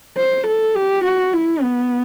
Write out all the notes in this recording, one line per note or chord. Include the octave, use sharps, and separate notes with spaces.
C5
A4
G4
F#4
E4
B3